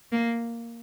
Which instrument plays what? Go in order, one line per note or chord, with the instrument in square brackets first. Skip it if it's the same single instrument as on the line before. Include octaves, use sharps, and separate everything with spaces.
[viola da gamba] A#3